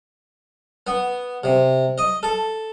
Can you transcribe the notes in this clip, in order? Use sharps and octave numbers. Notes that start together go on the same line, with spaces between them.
B3
C3
D#5
A4